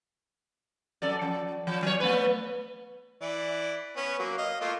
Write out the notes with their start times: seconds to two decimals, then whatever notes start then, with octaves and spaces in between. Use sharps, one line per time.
1.02 F#2 A4 D5
1.21 F3
1.67 F3
1.83 F#3 C#5
2.00 A3 B3 B4
3.21 E3 E4 D5
3.96 B3 C#4 B4
4.19 F#3 A#3
4.38 D#5 F5
4.61 A3 A#3 F4